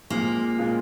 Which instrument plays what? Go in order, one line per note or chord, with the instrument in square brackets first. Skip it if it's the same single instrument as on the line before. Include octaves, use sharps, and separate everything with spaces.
[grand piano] A#2 G#3 C4 F4 [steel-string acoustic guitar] A#3
[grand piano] A#2 G#3 C4 F4